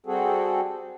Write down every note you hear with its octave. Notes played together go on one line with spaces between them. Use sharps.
G3 C4 F#4 G#4 A4